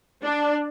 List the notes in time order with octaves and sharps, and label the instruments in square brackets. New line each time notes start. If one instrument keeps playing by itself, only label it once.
[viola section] D4